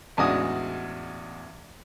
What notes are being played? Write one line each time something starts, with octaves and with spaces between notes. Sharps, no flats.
A1 E2 G#3 D4 F#4 D#6